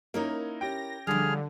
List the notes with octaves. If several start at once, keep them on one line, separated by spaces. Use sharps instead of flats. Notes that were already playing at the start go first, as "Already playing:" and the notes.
A#3 C#4 D#4 E4 A#4 C#5
C#4 G4 G5 A#6
D3 F3 G3 G#4 F6